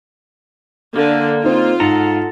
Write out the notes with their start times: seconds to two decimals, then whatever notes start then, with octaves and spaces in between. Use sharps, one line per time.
0.96 D3 A#3
1.44 C4 D#4 F4
1.80 G#2 A4 F#5 A#5